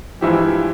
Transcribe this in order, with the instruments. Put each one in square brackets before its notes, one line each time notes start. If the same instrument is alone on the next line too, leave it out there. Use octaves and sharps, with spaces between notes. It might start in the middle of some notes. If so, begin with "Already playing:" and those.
[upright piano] G2 E3 G#3 E4 G4 [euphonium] F3